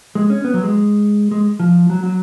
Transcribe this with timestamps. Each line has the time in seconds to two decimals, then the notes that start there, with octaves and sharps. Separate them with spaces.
0.15 G#3
0.30 C#4
0.44 B3
0.54 F#3
0.64 G#3
1.31 G#3
1.60 F3
1.90 F#3
2.03 F#3